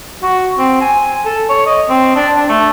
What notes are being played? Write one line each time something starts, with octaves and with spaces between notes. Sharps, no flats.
F#4
C4
G#5
A4
C#5
D#5
C4
D4
D4
A3